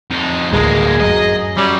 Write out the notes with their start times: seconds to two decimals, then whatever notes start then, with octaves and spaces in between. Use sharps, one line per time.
0.10 F2 D#4
0.53 A1 D2 G2 G#3 A#3 G#4
1.00 F#2 F#3 D#5
1.57 F#3 G3 C#4